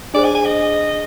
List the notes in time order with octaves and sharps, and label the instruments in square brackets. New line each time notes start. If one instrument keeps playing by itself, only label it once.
[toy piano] D4 G#4 C5 [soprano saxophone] D5
[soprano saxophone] G#5
G#5
D#5